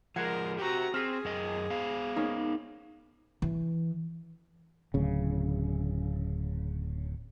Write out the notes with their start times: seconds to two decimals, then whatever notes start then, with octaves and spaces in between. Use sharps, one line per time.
0.16 F3 G#3 A#4 F#5 G#6 C7
0.59 F#4 G4 C5 A#5
0.94 C4 G#4 F6 B6 D#7
1.25 F#2 A#4 D#5
1.70 B3 C5 F5
2.16 A#3 C#4 D#4
3.42 E3
4.94 D1 C#3